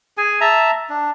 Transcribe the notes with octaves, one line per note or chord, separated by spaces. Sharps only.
G#4 G#5
E5 A5 A#5
D4